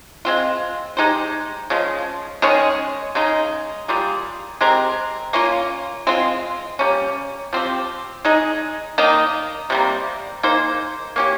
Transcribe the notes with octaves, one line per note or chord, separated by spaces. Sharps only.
G#3 C4 F4
G#3 D#4 G4 C5
C#3 F3 G#3
D#3 G#3 C#4 G#4
C#3 G#3 D#4
G3 A#3 F4 G#4
G#3 C4 G4 A#4
A#3 C#4 F4
G#3 C4 F4
G3 A#3 C#4
F3 C4 G4
G#3 D#4 G#4
D#3 A#3 D#4
C3 G3 A#3
A#3 D#4 G#4 C5
A#3 C#4 G4